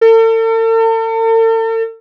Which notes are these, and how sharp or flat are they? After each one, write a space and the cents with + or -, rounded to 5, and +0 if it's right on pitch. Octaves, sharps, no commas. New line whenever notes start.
A4 +45